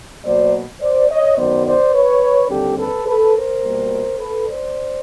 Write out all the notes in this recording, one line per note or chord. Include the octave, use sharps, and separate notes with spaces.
B2 F#3 A#3 C5 D5
C5 D5
C#5 D#5
F#2 D#3 F#3 B3 C5 D5
C5 D5
B4 C#5
D#2 D3 G3 C4 G4 A4
A4 B4
A4 B4
A#4 C5
B2 G3 A#3
A4 B4
C5 D5